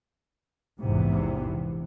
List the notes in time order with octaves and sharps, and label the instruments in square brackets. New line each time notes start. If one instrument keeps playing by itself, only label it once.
[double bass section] A#1 E2 G#2 C3 E3 B3